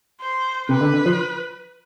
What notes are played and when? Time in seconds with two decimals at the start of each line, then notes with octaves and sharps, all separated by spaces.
0.21 C5
0.69 C3 B4
0.81 D3
0.94 D3
1.06 F3